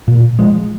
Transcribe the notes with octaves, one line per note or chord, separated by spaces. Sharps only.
A#2
F3 G#3